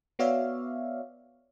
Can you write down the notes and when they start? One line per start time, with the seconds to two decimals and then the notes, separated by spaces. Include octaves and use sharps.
0.19 B3 F#4 C#5 D5 E5 F5